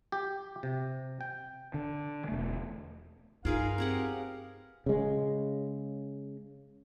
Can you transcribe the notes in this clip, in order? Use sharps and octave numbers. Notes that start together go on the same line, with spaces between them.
G4
C3
G5
D3
E1 A3
G2 D#4 F4 G#4 A#4 B4 F5
C4 G4 G#4 F#5
C#3 G#3